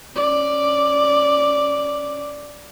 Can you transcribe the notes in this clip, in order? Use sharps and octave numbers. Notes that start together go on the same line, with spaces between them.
C#4 D5